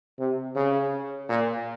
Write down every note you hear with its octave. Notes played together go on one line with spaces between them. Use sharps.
C3
C#3
A#2